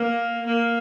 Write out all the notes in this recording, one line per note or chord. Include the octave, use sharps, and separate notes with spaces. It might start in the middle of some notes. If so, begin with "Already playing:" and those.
Already playing: A#3
A#3